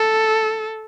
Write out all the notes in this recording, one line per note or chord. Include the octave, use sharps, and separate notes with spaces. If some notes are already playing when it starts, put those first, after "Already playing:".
Already playing: A4